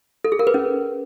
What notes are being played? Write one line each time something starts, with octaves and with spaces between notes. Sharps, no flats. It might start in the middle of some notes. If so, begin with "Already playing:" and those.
A4
G#4
A#4
B4
C#4